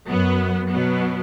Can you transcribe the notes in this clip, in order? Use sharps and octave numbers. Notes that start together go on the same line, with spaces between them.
F#2 F#3 B3
B2 F#3 B3